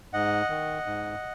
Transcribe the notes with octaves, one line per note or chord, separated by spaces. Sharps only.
G#2 D#5 F#5
D#3
G#2